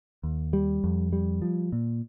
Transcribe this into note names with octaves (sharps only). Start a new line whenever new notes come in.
D#2
G3
F2
G3
F3
A#2